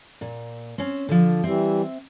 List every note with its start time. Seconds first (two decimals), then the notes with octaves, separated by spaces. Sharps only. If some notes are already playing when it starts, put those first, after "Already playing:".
0.21 A#2
0.78 C4 C#4
1.09 D3 F3
1.44 E3 G3 C4 E5